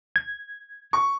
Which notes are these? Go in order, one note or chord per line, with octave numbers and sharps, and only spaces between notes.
G#6
C#6